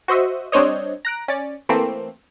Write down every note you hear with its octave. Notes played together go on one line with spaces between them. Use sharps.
F#4 C5 D#5 E5
G3 C4 D4 C5 C#5 D#5
A#5 F#6 D7
C#4 D5
E3 A3 A#3 C4